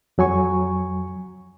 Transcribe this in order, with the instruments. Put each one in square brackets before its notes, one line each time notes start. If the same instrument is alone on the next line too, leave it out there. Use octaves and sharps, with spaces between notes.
[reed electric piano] F2 F#3 G#5 C#6